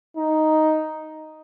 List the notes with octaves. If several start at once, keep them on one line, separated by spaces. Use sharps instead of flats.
D#4